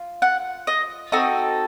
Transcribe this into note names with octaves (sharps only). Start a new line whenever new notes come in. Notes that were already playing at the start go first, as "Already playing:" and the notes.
Already playing: F4
F#5
D#5
C4 D#4 F#4 A4 D#5